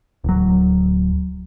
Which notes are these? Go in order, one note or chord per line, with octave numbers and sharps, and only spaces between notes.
D1 F#3